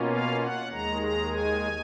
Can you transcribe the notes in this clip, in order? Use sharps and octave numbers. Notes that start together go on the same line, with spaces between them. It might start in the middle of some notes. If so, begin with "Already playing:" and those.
Already playing: B2 A#3 C#4 F4
F5
F#5
D#2 D#3 G#3 A#5
A#5
G#5